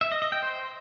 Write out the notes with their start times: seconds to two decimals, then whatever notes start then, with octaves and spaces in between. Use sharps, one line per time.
0.01 E5
0.12 D#5
0.22 D#5
0.32 G5
0.42 C5